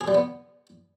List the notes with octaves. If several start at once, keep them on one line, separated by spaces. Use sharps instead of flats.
G#4
G3
B3